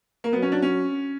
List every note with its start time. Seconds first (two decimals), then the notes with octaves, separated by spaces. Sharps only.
0.24 A#3
0.33 F#3 B3
0.42 C#4
0.52 D4
0.62 C#4